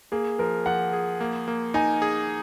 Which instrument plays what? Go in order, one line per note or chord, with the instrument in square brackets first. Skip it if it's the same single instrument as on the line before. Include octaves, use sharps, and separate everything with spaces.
[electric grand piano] A#3 [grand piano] G#4
[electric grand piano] F3 [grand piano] A#4
[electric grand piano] F3 [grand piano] F#5
[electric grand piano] G#4
A#3
A#3
[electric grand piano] D#4 [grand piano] G#5
[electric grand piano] G#4